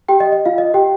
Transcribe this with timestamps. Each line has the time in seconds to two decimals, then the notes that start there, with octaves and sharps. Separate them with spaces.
0.09 G4 G5
0.20 D#5
0.32 D#5
0.45 F4 F5
0.58 D#5
0.74 G4 G5